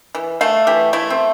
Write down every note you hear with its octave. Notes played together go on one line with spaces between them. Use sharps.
E3
A3 F5
E3 G4
A3 E4
C4